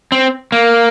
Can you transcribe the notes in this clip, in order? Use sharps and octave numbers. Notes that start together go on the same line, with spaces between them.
C4
A#3